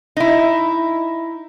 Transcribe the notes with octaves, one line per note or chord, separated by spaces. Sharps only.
D#4 E4